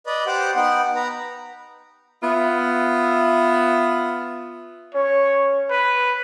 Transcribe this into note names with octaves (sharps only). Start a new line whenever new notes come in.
B4 D5 D#5
G4 C5 F#5 D6
B3 D#4 F#5 G5
B4 A#5
B3 F4 E5
C#4 C#5
B4